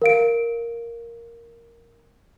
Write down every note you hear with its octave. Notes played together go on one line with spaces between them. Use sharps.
A#4 F5 D7